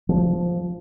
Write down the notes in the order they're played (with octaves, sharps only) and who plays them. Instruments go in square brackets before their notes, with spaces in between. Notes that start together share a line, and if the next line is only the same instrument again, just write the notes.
[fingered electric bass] F3